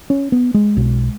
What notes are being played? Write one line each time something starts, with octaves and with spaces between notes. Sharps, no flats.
C#4
B3
G#3
B1 B2